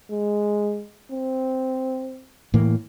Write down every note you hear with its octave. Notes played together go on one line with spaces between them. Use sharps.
G#3
C4
A2 E3 A#3